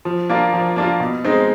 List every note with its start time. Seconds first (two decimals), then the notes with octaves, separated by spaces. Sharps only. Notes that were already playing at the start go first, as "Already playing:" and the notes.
0.05 F3
0.29 A#3 D4 F4
0.53 F3
0.76 A#3 D4 F4
1.00 B2
1.25 G#3 C4 D#4